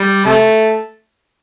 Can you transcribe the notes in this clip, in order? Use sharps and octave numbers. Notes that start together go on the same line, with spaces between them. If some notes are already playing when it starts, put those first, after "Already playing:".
Already playing: G3
C3 A3